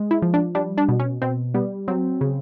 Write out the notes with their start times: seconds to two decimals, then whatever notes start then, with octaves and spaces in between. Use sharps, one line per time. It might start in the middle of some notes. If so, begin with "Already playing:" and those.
Already playing: G#3
0.11 E4
0.22 F3
0.34 D4
0.55 G3 D4
0.78 D4
0.89 B2
1.00 C#4
1.22 B2 C4
1.54 G3 B3
1.88 F#3 C4
2.21 C#3